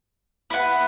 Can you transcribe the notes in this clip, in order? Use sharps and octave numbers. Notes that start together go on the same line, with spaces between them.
E4 B4 F#5